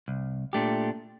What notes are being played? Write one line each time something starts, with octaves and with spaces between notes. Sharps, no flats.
C2
A#2 A3 D4 G4